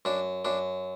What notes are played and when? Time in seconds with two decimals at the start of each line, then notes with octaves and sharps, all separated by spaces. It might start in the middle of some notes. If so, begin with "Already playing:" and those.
0.05 F#2 D4
0.45 F#2 D4